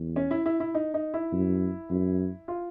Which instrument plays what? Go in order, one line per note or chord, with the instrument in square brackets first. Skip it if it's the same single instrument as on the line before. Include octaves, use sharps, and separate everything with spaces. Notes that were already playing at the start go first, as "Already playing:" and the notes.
Already playing: [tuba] E2
[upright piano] C#4
E4
E4
E4
D#4
D#4
E4
[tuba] F#2
F#2
[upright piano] F4